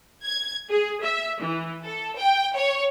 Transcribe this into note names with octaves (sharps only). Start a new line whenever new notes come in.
G#6
G#4
E5
E3
A4
G5
C#5